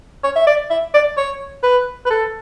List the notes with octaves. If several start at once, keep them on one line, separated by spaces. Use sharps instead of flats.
C#5
E5
D5
E5
D5
C#5
B4
B4
A4